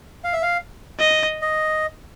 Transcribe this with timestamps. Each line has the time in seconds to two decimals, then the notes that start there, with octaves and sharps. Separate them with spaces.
0.24 F5
0.33 E5
0.42 F5
0.99 D#5
1.42 D#5